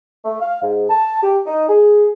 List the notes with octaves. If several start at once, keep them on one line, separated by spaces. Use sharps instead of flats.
A3
F5
G#2
A5
G4
D#4
G#4